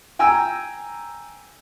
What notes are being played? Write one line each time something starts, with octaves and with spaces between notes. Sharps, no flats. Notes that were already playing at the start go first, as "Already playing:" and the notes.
G5 G#5 A#5 E6